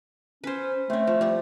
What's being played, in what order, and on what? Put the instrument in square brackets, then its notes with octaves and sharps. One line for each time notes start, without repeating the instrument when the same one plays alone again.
[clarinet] C#4 [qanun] B4 C5
[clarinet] A3 [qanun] C4 C#4
[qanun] F3
F3 G3